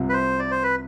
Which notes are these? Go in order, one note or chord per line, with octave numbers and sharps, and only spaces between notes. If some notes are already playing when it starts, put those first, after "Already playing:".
Already playing: C2 C3 F3
B4
C5
D5
C5
B4